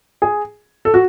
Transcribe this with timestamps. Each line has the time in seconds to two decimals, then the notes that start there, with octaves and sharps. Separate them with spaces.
0.22 G#4
0.85 A4
0.94 F#4